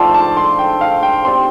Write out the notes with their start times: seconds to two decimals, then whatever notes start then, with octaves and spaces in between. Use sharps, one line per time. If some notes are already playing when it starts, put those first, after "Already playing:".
Already playing: F3 A3 D4 F4 D5 F5 G5 C6
0.14 A5
0.37 C6
0.59 G5
0.81 F5
1.03 G5
1.25 C4 G4 D5 C6